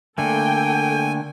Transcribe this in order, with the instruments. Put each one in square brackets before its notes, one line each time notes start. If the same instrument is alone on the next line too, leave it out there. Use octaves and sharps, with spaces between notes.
[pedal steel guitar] D3 A3 A#3 [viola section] A4 G5 [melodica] G#5